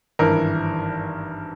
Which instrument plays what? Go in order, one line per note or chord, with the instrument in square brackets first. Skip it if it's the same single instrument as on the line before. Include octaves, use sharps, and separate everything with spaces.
[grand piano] G#1 G2 E3 A#4